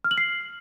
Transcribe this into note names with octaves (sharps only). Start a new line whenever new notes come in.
F6
F#7
C7